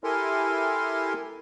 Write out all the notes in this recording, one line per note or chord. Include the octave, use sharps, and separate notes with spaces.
E4 G4 A4 A#4 G#5 C6